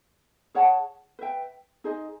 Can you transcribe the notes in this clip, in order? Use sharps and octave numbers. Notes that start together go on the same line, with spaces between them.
G#4 C#5 F#5 A5
B4 E5 G5
D#4 G#4 C5 D#5